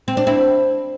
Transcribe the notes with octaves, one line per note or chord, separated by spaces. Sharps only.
C4
D4
C4 E4